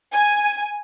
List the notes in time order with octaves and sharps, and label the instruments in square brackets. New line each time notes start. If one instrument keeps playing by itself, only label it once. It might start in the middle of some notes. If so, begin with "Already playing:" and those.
[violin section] G#5